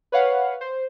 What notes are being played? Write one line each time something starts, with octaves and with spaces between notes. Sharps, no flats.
B4 C#5 F5 F#5
C5